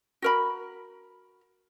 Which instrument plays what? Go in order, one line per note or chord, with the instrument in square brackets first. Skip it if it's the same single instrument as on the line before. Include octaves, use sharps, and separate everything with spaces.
[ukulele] F#4 A#4 B5